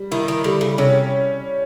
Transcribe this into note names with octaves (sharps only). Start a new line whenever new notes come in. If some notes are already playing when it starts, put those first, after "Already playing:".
Already playing: G3
D#3 E4
D#3
D3 G3
C#3
C3 C#4